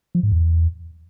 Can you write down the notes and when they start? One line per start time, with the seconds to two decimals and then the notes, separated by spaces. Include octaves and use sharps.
0.15 F3
0.23 G#2
0.32 E2